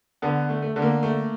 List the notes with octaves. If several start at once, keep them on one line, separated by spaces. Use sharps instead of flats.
D3 B3
A3
A3
D3
A#3
A3